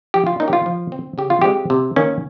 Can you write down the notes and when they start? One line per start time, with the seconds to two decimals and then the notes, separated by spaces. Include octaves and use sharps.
0.14 F3 G4
0.27 F4
0.40 A#3 C#4 D#4
0.48 G4
0.53 F4
0.66 F3
0.92 C4
1.18 C#3 G4
1.30 F4
1.41 G#3 C4 G4
1.70 C3
1.96 D#3 A#3 C#4